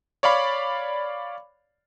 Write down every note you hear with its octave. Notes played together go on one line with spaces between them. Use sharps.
C#5 D5 F5 B5 D6